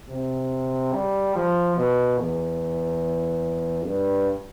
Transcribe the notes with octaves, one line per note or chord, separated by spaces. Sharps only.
C3
G3
F3
B2
E2
G2